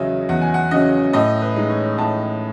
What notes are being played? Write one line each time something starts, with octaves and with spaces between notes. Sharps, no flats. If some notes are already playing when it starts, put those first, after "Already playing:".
Already playing: E2 C#3 F#3 C#4 D#5 E5
E2 F#5
G#5
F#5
C#3 F#3 C#4 D#5
A2 D#5
B4
G#3 D#4
C#5
A2 A5